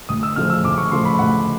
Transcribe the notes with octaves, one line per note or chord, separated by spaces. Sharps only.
D2 D#6
E6
C#3 F3 A3 F6
E6
D2 D6
C#6
C#3 F3 A3 C6
B5
D2 F#5